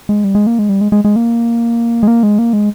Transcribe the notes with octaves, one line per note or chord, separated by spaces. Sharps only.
G#3
G3
G#3
A#3
G#3
G3
G#3
G#3
G#3
A#3
G#3
A#3
G#3
A#3
G#3